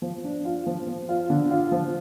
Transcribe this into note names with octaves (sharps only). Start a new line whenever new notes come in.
F3
D4
F4
F3
F3
F4
D3
F4
F3